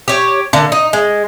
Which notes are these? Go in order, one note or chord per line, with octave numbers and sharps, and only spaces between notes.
G4 C#5
D3 A#3
D#4
G#3